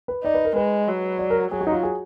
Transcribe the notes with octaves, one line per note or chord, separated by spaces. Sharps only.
B4
D#4 D5
B4
A#4
G#3 B4
F#3
D5
A#4
F#3 G#4
F#4
D#4
F4
G#4